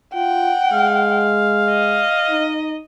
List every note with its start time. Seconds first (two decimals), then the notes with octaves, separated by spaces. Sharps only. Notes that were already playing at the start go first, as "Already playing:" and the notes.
0.14 F4 F#5 G5
0.73 G#3 F5
1.70 D#5
2.30 D#4